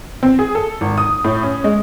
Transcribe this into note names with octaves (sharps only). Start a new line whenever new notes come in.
C4
G#4
A4
G#1
D#6
A2
C#4
G#3